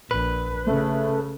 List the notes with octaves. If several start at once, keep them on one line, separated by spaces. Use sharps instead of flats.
A#1 B4
C#3 A3